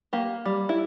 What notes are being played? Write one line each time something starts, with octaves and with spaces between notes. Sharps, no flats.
A#3 G4
G3
E4